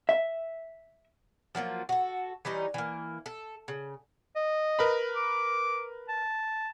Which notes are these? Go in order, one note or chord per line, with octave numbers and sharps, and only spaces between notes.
E5
F3 F#3 A#3 F4
F#4 A4
E3 G3 C#4 D#4
E3 A#3
A4
C#3
D#5
A#4 B4 B5
D6
A5